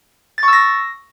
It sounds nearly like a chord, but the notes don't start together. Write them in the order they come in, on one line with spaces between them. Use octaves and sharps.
A6 C#6 E6 A#6